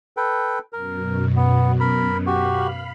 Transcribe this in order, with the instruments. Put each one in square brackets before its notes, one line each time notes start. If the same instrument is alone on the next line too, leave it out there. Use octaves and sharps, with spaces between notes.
[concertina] A4 B4 G5
[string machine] F#2 B2 [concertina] A#4
[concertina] B3
A#4 B5
[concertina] F#4 G4 [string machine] F5 B5